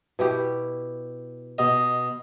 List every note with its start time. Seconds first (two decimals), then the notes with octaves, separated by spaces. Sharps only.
0.19 B2 E4 G4
1.58 B2 D#5